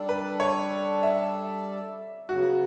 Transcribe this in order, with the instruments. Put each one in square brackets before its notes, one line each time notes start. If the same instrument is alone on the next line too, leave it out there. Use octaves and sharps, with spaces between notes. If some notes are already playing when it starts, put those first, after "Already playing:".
Already playing: [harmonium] G3 D4 A4 D5
[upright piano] B4
C#5
E5
[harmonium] C#3 F#3 B3 [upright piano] F#4